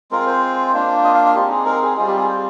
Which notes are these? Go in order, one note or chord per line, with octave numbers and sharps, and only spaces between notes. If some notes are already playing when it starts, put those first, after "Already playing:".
G#3 C4 F4 A#4
C5
A#3 D4 F4
D#5
F5
F5
G#3 C4 D#4 G4
G#4
A#4
G#4
G3 C4 F4 G#4
G4
G#4
C5